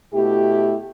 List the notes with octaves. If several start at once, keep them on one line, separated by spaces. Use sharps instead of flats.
B2 A3 E4 G4